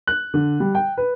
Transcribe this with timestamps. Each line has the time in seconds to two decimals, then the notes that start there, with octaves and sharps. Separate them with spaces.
0.07 F#6
0.34 D3
0.60 G3
0.75 G5
0.98 B4